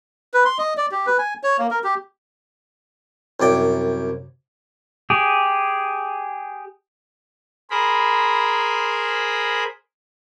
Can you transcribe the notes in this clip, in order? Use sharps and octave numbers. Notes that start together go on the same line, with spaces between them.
B4
C6
D#5
D5
G4
B4
G#5
C#5
A#3
A#4
G4
C2 F#2 D5 G5
G4 G#4
G#4 A#4 C5 B5